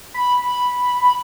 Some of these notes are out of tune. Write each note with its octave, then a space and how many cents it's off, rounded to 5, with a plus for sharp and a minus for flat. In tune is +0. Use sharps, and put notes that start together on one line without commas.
B5 +0